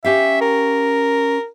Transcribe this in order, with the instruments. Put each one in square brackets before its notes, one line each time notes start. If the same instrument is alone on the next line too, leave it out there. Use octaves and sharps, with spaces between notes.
[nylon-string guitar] C#4 G4 F5 [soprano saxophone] E5
[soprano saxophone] A#4